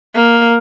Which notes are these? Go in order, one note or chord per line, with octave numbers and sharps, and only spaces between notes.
A#3